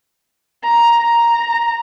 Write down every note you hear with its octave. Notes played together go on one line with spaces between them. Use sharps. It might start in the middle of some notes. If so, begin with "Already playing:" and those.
A#5
A#5